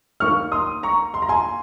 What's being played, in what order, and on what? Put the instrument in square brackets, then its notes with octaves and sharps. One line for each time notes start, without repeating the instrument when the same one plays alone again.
[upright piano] D#2 D#3 A#3 C#6 F6
C6 D#6
A#5 C#6
C6
A#5
G#5 C6